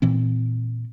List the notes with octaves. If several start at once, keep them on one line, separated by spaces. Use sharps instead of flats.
A#2 E3 C4